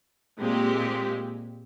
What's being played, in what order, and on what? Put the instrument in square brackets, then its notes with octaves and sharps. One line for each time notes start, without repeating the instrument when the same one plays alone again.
[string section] A#2 G#3 C4 G4